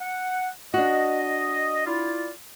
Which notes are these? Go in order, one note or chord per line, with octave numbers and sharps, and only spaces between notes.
F#5
D4 F#4 D#5
E4 F4 D5